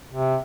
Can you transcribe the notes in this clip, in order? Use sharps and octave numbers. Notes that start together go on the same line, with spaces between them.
C3